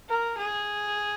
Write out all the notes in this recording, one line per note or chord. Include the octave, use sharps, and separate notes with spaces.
A#4
G#4